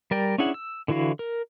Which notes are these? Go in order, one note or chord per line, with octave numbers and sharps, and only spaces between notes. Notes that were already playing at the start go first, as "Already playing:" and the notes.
G3 A#4 D5 G5
C#4 D4 E4 G#4 F#5
E6
D3 E3 E4 F#4 F5
A#4